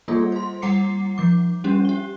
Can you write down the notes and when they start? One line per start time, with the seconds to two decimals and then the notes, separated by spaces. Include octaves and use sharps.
0.08 G3 A#3 F4 G#4 A4
0.32 C5 C6
0.62 G3 F#5 A#5 D6 C7 C#7
1.18 F3 D6
1.64 G3 C#4 D4 G4
1.85 G4 G7